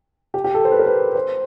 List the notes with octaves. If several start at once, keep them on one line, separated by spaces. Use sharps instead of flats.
G4
G4
A4
C5
B4
A#4
B4
C5